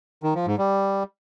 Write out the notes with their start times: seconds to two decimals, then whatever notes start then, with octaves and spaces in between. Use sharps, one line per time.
0.23 D#3
0.35 F3
0.46 G#2
0.58 G3